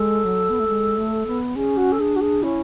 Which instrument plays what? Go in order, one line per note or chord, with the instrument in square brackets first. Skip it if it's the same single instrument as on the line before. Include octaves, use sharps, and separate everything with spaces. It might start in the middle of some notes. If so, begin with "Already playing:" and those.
Already playing: [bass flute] G#3 [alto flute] A4
[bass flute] F#3
B3
A3
G#3
A3
B3
[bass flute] C#4 [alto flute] G#4
[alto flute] F#4
A4
[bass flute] D4 [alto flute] G#4
[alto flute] F#4
G#4
[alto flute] C#4 [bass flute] E4